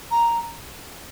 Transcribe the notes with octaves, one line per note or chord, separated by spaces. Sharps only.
A#5